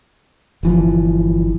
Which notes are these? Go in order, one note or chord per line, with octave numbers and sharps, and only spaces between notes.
G1 E3 F3